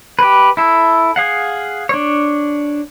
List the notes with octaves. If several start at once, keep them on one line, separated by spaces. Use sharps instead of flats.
G4 B4
E4 A4
G#4 F5 F#5
D4 C#5